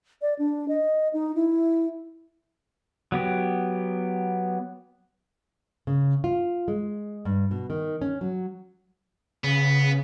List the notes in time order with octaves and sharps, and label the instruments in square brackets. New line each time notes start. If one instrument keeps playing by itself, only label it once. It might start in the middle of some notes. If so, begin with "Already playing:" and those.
[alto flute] D5
D4
D#5
D#4
E4
[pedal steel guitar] F#3 B3 G4
[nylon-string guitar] C#3
F4
G#3
G2
B2
D#3
C#4
F#3
[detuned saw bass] C#3 [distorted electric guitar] B3